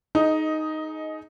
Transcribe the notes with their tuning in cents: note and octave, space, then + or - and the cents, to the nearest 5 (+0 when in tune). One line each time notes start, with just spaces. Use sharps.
D#4 +0 G#4 +35 D#5 +10